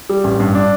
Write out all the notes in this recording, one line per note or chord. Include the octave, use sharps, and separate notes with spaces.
G3
A1
G2
D4